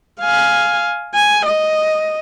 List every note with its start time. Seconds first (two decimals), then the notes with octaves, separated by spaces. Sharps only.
0.21 F5 G#5
1.15 G#5
1.46 D#5